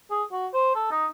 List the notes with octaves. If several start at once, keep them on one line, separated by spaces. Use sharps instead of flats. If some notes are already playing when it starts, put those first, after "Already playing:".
G#4
F#4
C5
A4
D#4